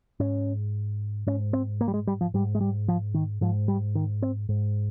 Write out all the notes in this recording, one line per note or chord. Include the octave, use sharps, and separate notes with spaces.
G#2 C#4
G#2 C#4
C4
A#3
G3
G#3
G3
F3
G#2 G3
G#3
G3
F3
D#3
G#2 F3
G3
D#3
C4
G#2